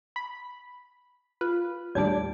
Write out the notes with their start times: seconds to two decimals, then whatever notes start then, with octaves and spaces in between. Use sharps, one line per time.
0.16 B5
1.41 F4 B4
1.95 D#2 A2 G3 D4 C#5 D5 A5 G#6